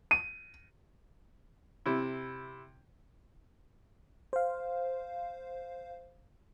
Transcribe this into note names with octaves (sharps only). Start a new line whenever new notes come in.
D#7
C3 E4
C5 F5